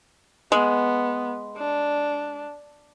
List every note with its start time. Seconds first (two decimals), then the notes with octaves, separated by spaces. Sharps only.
0.52 G#3 B3
1.58 D4